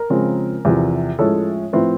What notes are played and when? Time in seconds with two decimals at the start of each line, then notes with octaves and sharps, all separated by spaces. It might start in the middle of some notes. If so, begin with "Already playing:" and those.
Already playing: A#4
0.10 C#3 F3 G#3 C4
0.65 E2 C3 F3
1.19 A2 F3 G#3 C#4 A4
1.73 A2 F3 A3 C4 B4